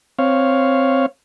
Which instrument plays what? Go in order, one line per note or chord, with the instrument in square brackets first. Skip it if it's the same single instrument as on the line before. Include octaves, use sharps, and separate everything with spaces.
[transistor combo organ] C4 C#5 F5